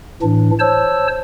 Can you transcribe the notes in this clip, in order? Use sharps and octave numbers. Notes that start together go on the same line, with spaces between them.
A2 E3 D4
C5 C#5 A5 E6